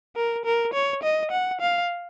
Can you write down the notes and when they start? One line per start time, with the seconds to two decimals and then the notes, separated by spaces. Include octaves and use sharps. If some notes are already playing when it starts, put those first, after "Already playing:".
0.16 A#4
0.45 A#4
0.74 C#5
1.03 D#5
1.32 F#5
1.61 F5